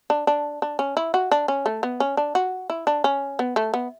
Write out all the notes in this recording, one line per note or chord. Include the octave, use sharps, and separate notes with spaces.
D4
D4
D4
C#4
E4
F#4
D4
C#4
A3
B3
C#4
D4
F#4
E4
D4
C#4
B3
A3
B3